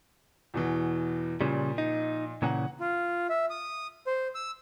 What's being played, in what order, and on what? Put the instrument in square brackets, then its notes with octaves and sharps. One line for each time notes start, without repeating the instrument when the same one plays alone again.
[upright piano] E2 B2 E3
[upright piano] A#2 F3 [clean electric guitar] C#3 G3
[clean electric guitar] D#4
[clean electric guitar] A#2 C#3 E3 [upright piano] F#5 A#5
[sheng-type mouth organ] F4
E5
D#6
C5
E6